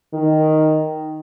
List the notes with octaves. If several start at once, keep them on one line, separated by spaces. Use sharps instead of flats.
D#3